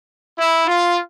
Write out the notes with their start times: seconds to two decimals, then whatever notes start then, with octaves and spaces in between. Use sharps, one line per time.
0.38 E4
0.67 F4